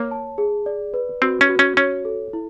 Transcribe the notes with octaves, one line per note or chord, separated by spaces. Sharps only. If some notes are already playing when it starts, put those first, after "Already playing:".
Already playing: A#3 C#5
A5
G#4
D5
B4
C4 F#4
C#4
F#4
C#4
C#4 C#5
A4
E4